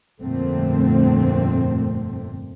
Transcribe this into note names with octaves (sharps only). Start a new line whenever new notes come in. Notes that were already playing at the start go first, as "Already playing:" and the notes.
G1 F2 A#2 D3 A3 C4